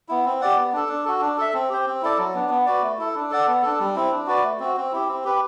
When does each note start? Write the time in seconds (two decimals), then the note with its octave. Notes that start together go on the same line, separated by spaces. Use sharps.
0.09 B3 E4
0.25 C4
0.41 G4 D5 F#5
0.57 B3
0.73 D4 A4
0.88 D4
1.05 F#4 A4
1.21 D4
1.38 A4 E5
1.54 C4
1.69 G4 C5
1.86 C4
2.02 E4 A4 D5
2.18 F#3
2.34 B3 D4
2.50 B3
2.66 F#4 B4 D5
2.83 A3
2.98 E4 A4
3.15 D4
3.31 A4 D5 F#5
3.47 B3
3.63 D4 A4
3.80 G3
3.96 C4 E4
4.11 D4
4.27 F#4 B4 D5
4.43 A3
4.60 C4 F#4
4.76 C4
4.92 E4 G4
5.08 C4
5.24 G4 B4